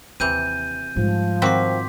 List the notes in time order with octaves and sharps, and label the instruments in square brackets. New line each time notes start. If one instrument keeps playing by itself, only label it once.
[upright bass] D#2 [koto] C3 E3 [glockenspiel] G6 D#7
[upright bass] G#2 G3 [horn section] F3
[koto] D#3 C4 F#4 [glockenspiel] C6 D6 B6